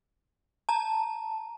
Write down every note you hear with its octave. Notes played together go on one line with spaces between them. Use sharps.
A5 A#5